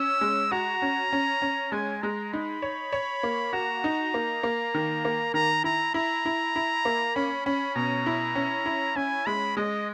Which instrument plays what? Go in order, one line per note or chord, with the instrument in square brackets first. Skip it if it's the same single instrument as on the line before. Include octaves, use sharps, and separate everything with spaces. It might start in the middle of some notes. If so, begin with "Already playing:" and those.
Already playing: [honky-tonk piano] C#4 [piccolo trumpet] E6
[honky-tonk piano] G#3
[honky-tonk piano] F#4 [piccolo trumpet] A#5
[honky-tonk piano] C#4
C#4
C#4
[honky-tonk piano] G#3 [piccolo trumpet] G#5
[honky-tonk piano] G#3 [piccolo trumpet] A#5
[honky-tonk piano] D#4 [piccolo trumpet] B5
[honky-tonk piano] C#5
C#5
A#3
[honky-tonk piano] F#4 [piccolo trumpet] A#5
[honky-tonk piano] D#4
A#3
A#3
D#3
A#3
[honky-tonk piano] D#3 [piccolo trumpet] A#5
[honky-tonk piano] E4 [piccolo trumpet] A#5
[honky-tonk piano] E4 [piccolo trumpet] A#5
[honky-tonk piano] E4
E4
A#3
[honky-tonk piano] C#4 [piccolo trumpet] B5
[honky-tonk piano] C#4 [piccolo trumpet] B5
[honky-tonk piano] B2 [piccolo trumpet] A#5
[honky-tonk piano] E4
C#4
E4
[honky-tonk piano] C#4 [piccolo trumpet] G#5
[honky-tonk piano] G#3 [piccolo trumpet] B5
[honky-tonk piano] G#3 [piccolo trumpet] D#5